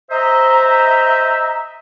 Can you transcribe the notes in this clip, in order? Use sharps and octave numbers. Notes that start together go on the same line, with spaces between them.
C5 D#5 E5 A#5